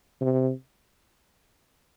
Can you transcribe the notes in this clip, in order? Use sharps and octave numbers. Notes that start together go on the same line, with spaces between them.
C3